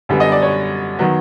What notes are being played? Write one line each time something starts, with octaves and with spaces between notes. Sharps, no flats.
F#2 D3 G3 B3
D#5
D5
C#5
D#3 F#3 B3